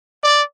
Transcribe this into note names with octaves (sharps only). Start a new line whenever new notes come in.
D5